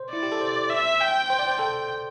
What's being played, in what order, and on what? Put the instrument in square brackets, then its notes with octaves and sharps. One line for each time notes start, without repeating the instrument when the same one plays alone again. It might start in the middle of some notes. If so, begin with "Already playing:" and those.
Already playing: [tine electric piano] C5
[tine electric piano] E4 [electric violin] D5
[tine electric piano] G4
A4
C5
[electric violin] E5
G5
[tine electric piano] C5
D5
C5
[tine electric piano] A4 [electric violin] G5